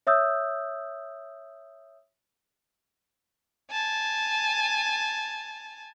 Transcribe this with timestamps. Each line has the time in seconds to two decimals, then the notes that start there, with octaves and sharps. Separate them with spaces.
0.07 C#5 E5 D#6 E6 G6
3.71 G#5 A5